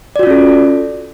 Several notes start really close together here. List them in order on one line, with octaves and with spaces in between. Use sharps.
D5 F#4 F4 C#4 A4